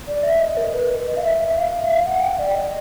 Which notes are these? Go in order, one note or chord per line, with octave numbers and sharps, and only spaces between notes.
D5
E5
D#5
A#4
B4
D#5
F5
E5
E5
F5
E5
F5
F#5
G5
D5
D#5